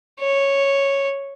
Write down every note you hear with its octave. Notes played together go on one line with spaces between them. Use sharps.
C#5